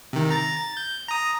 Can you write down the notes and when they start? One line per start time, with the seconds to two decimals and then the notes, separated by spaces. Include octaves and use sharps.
0.13 C3 D#3
0.30 A#5 A6
0.56 A6
0.77 G6
1.08 A#5 D#6